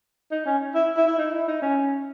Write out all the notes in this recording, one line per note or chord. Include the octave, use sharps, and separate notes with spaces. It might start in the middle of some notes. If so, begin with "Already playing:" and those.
D#4
C#4
E4
E4
E4
D#4
E4
D#4
C#4